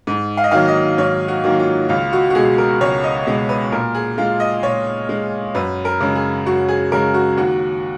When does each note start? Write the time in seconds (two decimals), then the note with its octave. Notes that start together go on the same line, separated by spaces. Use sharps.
0.07 G#2
0.37 F5
0.44 D#5
0.51 D#3 F#3 A#3 F5
0.68 D#5
0.98 G#2 C#5
1.28 F#4
1.44 D#3 F#3 A#3
1.59 F4
1.89 C#2 F4
2.13 F#4
2.30 F#4
2.35 B2 G#3 G#4
2.58 A#4
2.81 C#2 C#5
3.04 D#5
3.26 B2 G#3 D#5
3.49 B4
3.72 A#2 A#4
3.95 G#4
4.18 G#3 F4
4.40 D#5
4.63 A#2 C#5
5.09 G#3
5.55 F#2 B4
5.85 A#4
6.01 C#3 G#3
6.15 G#4
6.46 F#2 F#4
6.68 G#4
6.92 C#3 G#3 A#4
7.14 F#4
7.37 D#2 F#4